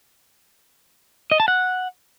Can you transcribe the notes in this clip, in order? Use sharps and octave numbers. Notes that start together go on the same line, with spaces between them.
D#5
A5
F#5